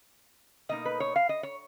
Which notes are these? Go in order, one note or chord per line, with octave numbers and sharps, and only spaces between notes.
B2 A#3 D#4 D#5
B4
C#5
F5
D#5
C#5